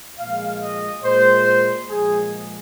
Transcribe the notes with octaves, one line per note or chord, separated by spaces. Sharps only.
A#2 F3 G#3 F5
D#5
A#2 G#3 C5
A#2 F3 G#3 G#4